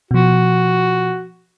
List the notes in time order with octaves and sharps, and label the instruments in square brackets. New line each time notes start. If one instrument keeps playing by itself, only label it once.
[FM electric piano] B2 F3 [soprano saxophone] F#4